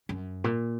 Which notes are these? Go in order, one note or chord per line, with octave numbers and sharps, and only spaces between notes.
F#2
A#2